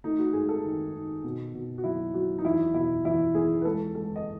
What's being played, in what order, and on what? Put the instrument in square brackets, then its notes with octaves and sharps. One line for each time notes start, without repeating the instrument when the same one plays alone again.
[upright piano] A3 D#4
F#4
G#2 G#4
A4
D#3
D#3
B2
B2
F#4
F#3 E4
F#3 F#4
D#4
E2 E4
B2 E4
E2 E4
E2 G#4
B4
G#3 A4
G#3 A4
D#5